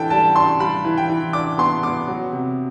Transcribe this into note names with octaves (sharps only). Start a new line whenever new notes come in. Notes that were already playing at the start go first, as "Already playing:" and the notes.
Already playing: E3 D4 A4 G5
G3 A5
D4 C6
G3 B5
E3
G5
E3
D4 D6
B3 C6
B3 D6
F#3
C3